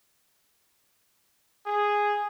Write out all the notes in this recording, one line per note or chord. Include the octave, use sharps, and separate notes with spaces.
G#4